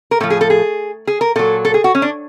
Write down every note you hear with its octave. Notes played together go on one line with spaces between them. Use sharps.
A#4
A2 F3 A4
G#4
A4
G#4
G#4
A#4
A#2 F#3 A4
A4
G#4
F#4
C#4
D4